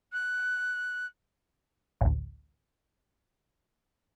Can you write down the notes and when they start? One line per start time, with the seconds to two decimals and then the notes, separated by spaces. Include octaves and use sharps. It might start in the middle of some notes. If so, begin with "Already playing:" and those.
0.12 F#6
2.01 A1 D2